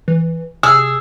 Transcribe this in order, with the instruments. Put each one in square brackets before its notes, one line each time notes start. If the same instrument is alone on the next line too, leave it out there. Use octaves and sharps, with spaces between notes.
[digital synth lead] E3
[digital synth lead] C3 [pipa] G#4 [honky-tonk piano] E6